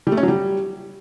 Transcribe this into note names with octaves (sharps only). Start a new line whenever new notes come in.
G3
A3
C#4
F#3
G3